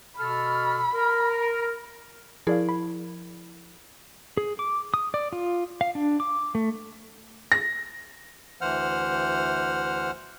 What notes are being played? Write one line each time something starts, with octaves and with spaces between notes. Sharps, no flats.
B2 A4 B5 F6
A#4
F3 E4 G#4 A#4 D5 F5
B5
G#4
D6
D#6
D5
F4
F5
D4
D6
A3
A#6
D2 E3 C5 F#5 F6